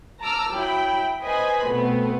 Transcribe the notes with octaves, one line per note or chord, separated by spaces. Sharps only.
A5 A#5 D6 E6 F6
F#3 E4 G5 B5
B4 C5 D#5 G#5 B5
B2 A3 B3 C4